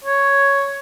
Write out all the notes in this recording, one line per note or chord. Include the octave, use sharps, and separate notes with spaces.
C#5